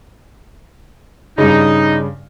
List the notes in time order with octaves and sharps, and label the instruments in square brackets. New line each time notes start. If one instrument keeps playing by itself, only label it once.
[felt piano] G2 C#3 [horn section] D#4